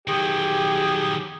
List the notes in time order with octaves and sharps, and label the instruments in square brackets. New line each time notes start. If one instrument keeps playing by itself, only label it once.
[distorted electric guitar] D#3 F#3 [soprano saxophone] G4 [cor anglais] G#4